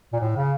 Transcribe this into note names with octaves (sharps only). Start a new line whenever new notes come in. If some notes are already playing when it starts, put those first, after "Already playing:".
A#2
A2
C#3